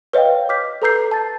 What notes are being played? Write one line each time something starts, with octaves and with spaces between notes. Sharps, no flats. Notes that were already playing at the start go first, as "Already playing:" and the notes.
B4 C#5 D#5 F5 G5
D6 F6 G6 B6
A4 B4 A#5 E6 G6 C7
A5 A6